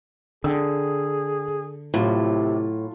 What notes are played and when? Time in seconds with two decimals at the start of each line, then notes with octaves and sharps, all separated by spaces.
0.44 D3 G#4 G5 D#6 E6
1.94 A2 C3 F#3 F4